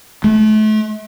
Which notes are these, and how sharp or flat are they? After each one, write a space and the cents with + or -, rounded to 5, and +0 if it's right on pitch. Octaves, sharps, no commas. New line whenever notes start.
A3 -35